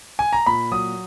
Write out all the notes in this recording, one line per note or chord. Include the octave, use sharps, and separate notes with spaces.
G#5
A#5
A#2 B5
F#3 D#6